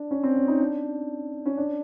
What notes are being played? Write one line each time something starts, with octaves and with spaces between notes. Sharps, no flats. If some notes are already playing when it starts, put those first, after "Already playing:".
Already playing: D4
C#4
C4
C#4
D#4
D4
C#4
D4